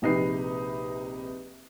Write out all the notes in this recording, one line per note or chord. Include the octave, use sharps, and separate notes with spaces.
A#1 C3 D#4 B4 C7